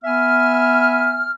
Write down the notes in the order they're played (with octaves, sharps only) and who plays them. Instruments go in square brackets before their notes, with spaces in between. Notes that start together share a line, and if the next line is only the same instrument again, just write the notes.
[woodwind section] B3 E5 G#5 F6